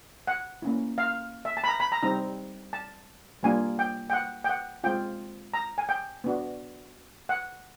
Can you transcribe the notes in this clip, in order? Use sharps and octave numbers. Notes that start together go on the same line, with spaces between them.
F#5
A#3 C#4 E4
F5
E5
A5
B5
A#5
B5
A#5
G3 C4 D#4 A#5
A5
G3 A#3 D4 F4 G#5
G5
G5
F#5
G5
F#5
G#3 C4 F4 G5
A#5
G#5
G5
B3 D4 F#4
F#5